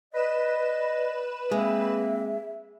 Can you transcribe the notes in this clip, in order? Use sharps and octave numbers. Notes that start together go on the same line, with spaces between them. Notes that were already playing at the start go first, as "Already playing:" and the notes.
B4 D5 D#5 E7
G#3 A#3 C4 E5